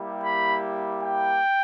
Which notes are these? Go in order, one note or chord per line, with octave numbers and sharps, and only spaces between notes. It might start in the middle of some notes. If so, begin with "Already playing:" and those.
Already playing: G3 A#3 E4 G4
B5
G5